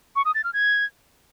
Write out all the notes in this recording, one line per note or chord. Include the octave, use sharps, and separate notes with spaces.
C#6
D#6
A6
F6
G#6